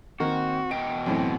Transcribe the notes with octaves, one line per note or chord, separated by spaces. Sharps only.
D#3 A#3 C4 F#4 A#4
B2 D#5 G5 D7
F#2 A2 E3 C4